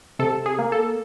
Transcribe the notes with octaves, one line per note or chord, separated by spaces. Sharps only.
C3 A4
G#4
A#3
A4